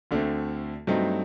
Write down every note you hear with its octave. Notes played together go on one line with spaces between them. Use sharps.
D2 D3 A3 C4
G2 F#3 A3 C4 D#4